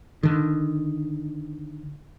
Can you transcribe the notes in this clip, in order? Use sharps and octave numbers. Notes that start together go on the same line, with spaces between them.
D3 D#3